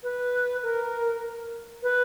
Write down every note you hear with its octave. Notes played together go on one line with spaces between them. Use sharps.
B4
A#4
B4